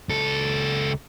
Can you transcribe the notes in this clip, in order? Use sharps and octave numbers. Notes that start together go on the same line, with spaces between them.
C#2 A4